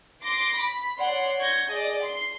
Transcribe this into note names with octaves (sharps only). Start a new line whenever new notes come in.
C6 D6 A#6
B5
C#5 D5 F#5 C6
C#6 G6 G#6 A#6
G#4 D5 D#5
C6 C7